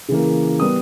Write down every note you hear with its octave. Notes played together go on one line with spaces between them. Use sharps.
C#3 E3 A#3
G3 B3 D#6